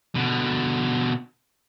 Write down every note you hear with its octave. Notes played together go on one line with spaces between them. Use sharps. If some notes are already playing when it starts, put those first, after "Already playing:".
B2 D3